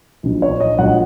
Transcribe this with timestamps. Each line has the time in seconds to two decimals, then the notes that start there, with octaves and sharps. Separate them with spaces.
0.23 A#1 A#2 F#3 D#4
0.42 C#5
0.60 D#5
0.78 A#1 A#2 F#3 D#4 F#5